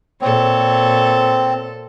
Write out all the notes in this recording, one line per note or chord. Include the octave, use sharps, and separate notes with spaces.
A#2 C4 A4 C#5